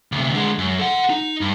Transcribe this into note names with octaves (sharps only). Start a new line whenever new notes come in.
D2 C3
D3 G#3
F#2
A4 F#5
D#4
G2